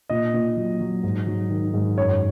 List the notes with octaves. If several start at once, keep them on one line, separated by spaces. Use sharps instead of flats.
A#2 D#5
A#2
F#3
F#3
G#2
F#3
D#3
G#2
F#2 C#5